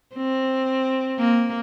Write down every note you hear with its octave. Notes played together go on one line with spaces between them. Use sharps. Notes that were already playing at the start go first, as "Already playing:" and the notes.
C4
A#3